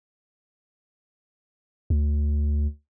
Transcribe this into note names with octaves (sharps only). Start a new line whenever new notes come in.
D2